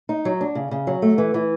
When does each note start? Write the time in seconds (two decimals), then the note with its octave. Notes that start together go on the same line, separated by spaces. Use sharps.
0.09 D#4
0.25 F#3
0.41 D4
0.55 C#3
0.71 C#3
0.87 F#3
1.02 A3
1.18 E3
1.34 E3